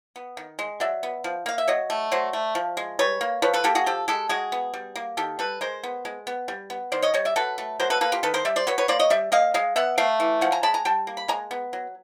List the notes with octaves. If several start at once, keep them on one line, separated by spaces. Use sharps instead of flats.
B3
D#3
G#3
F#3 D5 E5
B3
F3
A#3 F5
E5
F#3 C#5 D#5
A3
F#3 C5 D5
A3
F3
G#3
G3 B4 C#5
A#3
F3 B4 C#5
A4 B4
A#3 G4 A4
F#4 G#4
F3 G4 A4
G#3 G4 A4
G#3 F#4 G#4
B3
G3
A#3
D#3 G4 A4
G3 A4 B4
G#3 A#4 C5
B3
G#3
B3
G3
B3
D#3 C5 D5
C#5 D#5
G3 C#5 D#5
D5 E5
F#3 A4 B4
A3
F#3 A#4 C5
A4 B4
A#3 A4 B4
F4 G4
D#3 A4 B4
A#4 C5
G3 D5 E5
C5 D5
F#3 B4 C#5
B4 C#5
A#3 C5 D5
C#5 D#5
G3 D5 E5
A#3 D#5 F5
G#3 D#5 F5
B3 E5 F#5
A3 F5 G5
E3
F3 F#5 G#5
G#5 A#5
G#3 A5 B5
G#5 A#5
G3 G5 A5
A#3
B5
G#3 G#5 A#5
B3
F#3